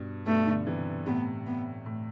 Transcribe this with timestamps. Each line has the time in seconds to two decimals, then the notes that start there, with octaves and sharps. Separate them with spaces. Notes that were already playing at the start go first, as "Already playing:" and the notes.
Already playing: G2 B2
0.27 G2 B2 A3
0.47 B2 D3
0.67 C3 E3
1.07 A2 C3 B3
1.47 B3
1.86 A2